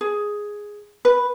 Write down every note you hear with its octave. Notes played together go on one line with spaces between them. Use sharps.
G#4
B4